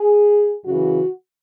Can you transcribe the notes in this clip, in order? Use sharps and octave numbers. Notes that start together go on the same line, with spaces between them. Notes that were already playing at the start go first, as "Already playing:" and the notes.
Already playing: G#4
F#2 C#3 E3 F#4